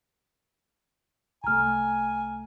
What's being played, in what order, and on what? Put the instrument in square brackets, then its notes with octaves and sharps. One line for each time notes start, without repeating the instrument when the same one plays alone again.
[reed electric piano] C2 A3 [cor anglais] G#5 [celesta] A#5 F6